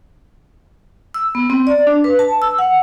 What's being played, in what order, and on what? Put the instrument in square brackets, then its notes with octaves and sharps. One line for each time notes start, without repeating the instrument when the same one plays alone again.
[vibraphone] E6
B3
C4
D5
D4
B4
A5
E6
F#5